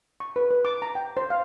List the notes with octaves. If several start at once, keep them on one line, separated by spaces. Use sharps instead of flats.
C#6
B4
B4
D6
A#5
G5
C5
F5